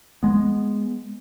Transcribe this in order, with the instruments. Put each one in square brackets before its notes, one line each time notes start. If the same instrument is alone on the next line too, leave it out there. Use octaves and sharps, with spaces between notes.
[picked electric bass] G#3 B3